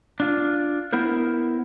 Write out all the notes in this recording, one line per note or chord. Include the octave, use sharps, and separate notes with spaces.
D4 F4
B3 E4 A#4 C5